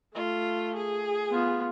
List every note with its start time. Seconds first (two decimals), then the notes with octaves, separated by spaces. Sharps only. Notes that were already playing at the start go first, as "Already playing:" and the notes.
0.15 A3 F4
0.77 G#4
1.30 B3 F4